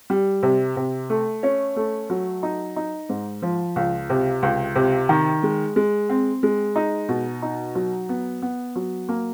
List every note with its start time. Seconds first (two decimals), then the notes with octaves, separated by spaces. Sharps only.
0.10 G3
0.43 C3
0.76 C3
1.10 A3
1.43 C#4
1.76 A3
2.10 F#3
2.43 D#4
2.76 D#4
3.09 G#2
3.42 F3
3.76 C#2
4.10 C3
4.43 C#2
4.75 C3
5.09 D#3
5.43 G#3
5.76 G#3
6.09 C4
6.43 G#3
6.76 D#4
7.09 B2
7.42 D#4
7.75 F#3
8.09 B3
8.42 B3
8.76 F#3
9.09 A#3